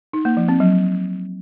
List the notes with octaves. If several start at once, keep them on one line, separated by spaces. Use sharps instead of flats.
D#4
A#3
F3
C4
F#3